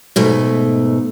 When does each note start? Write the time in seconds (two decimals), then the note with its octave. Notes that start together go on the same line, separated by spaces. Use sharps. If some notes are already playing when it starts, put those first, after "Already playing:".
0.16 G#2 B2 A3